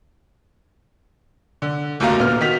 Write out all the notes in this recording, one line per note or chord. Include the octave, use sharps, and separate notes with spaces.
D3
F#1 D#2 F#3 A3 F5 A#5
A#2 B3 F6
D#3 F#4 B6 F7